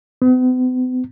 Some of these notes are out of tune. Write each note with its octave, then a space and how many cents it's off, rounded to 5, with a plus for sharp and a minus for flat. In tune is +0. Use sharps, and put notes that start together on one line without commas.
B3 +45